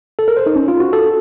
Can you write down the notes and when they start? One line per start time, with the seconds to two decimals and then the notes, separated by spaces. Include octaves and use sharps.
0.19 A4
0.28 A#4
0.37 C5
0.46 D#4
0.56 C#4
0.68 F4
0.80 F#4
0.93 A4